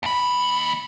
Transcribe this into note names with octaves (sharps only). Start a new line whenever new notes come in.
D#2 B5